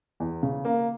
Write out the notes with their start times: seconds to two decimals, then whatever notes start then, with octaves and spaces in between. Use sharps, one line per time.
0.20 E2
0.43 C#3
0.65 A#3